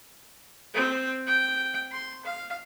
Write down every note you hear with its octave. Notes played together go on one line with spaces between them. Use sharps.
C4
G5
C6
F5